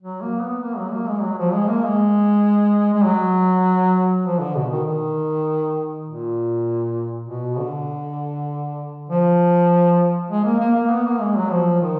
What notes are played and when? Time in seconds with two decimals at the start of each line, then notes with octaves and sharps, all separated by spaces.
0.02 F#3
0.22 A#3
0.42 B3
0.62 A#3
0.78 F#3
0.93 A#3
1.07 G#3
1.23 F#3
1.38 F3
1.53 G#3
1.68 A#3
1.84 G#3
2.93 G#3
3.04 F#3
4.26 F3
4.40 D3
4.56 B2
4.71 D#3
4.85 D#3
6.06 A#2
7.28 B2
7.58 D3
9.10 F3
10.31 G#3
10.45 A#3
10.60 A#3
10.75 A#3
10.91 B3
11.06 A#3
11.20 G#3
11.36 F#3
11.51 F3
11.82 D#3